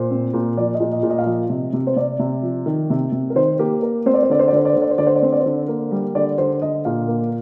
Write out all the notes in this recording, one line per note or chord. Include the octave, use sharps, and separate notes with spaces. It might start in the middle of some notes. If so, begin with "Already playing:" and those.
Already playing: A#2 C5
C4
A#2
F3 D5
D#5
A#2
D#5
A#2
D#5
F5
F3 D#5
C3
C3
C5
C3 D5
C3
F3
D#3
C3
C3
A#4
D#3 C5
A#3 G4
A#3 A#4
C4 C5
D5
C5
D3 D5
C5
D5
D3 C5
D5
D3 C5
D5
C5
D3 D5
C5
D5
C4 C5
D5
C5
D3
A#3
G3
D3 D5
D3 C5
D3 D#5
A#2 F5
A#3